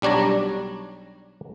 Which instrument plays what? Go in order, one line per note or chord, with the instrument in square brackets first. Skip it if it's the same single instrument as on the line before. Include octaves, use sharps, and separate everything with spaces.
[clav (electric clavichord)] B1 G3 D4 C#5 A#5